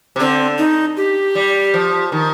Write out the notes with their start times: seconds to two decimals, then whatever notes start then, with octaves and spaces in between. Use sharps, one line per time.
0.16 C3
0.20 D3 C4
0.58 D#4
0.97 G4
1.35 G3
1.74 F3
2.12 D#3